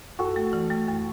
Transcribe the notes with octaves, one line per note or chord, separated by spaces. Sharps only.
F#2 F#4 A4
A3
E3
A3
F#2